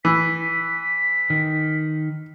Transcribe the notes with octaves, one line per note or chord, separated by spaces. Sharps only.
E3 B6
D#3